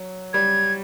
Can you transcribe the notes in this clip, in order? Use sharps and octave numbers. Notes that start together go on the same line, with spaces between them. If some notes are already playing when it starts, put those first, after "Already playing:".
Already playing: F#3
G3 G#6